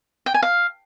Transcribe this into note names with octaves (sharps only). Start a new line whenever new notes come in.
G5
G#5
F5